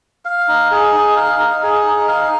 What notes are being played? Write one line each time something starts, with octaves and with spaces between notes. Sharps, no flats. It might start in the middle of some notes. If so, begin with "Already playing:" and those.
F5
D#4
G#4
D#4
F5
D#4
G#4
D#4
F5